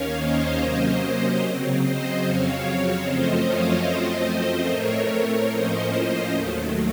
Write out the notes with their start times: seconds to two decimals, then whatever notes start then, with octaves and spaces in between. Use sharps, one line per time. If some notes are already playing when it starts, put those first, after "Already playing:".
Already playing: D#2 D#3 A#3 C#4 C#5 F5
0.19 C5 D#5
0.59 C3 F#3 A#3 C#4 C5 D#5
1.41 C#3 F#3 C4
1.82 C5 D#5
2.23 F2 C#3 F#3 C4 C#5 F5
2.64 C#5 F5
3.04 F#2 F3 A3 C4 C5 D#5
3.45 C#5 F5
3.86 F#2 F3 A3 C4 C5 D#5
4.68 A2 A3 C4 A#4 C#5
5.08 A#4 C#5
5.49 A2 F3 A#3 C#4 C5 D#5
6.31 D#2 D#3 F#3 A3